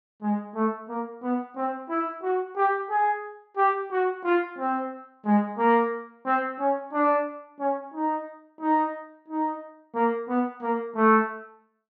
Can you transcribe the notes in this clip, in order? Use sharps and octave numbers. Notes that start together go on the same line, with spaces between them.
G#3
A3
A#3
B3
C4
E4
F#4
G4
G#4
G4
F#4
F4
C4
G#3
A#3
C4
C#4
D4
C#4
D#4
D#4
D#4
A#3
B3
A#3
A3